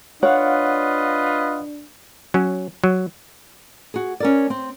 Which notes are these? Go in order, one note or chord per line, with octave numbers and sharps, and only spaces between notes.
D4 F4 B4 C#5 D#5 F5 F#5
F#3 C#4
F#3
F#4 G#4
C#4 A#4 D5
C4